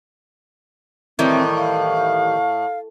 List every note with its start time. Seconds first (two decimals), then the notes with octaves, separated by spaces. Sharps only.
1.19 A2 D#3 E3 G3 C4
1.57 F5